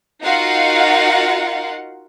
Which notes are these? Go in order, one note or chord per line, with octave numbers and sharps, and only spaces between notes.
D#4 F4 F#4 A#4 F5 F#5